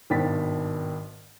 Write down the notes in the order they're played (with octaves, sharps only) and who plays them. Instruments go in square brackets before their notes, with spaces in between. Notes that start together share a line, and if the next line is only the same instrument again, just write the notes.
[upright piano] G#1 G2 B2 G5 A6 B6